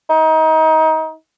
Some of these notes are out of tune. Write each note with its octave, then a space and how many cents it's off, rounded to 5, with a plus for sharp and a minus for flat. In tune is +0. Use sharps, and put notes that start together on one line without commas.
D#4 +25